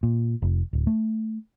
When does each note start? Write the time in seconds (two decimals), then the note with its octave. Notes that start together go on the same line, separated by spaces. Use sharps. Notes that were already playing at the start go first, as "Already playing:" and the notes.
0.03 A#2
0.42 F1
0.73 D1
0.87 A3